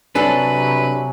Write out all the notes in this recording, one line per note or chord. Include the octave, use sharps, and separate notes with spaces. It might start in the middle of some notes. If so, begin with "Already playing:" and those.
C3 F#3 D4 A4 B4 G#5 F#7